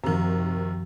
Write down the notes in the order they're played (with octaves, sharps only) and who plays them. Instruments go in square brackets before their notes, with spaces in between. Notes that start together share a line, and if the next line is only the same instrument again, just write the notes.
[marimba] F#2 F3 [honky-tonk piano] C3 D#3